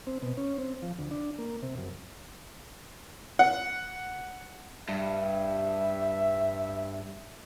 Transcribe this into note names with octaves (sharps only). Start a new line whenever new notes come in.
C4
B2
C#4
C4
F3
D2
D4
A#3
C3
F#2
F#5
G2 E5